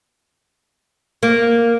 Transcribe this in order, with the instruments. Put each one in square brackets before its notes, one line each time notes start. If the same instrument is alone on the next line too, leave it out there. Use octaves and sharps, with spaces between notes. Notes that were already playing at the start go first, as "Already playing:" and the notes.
[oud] A#3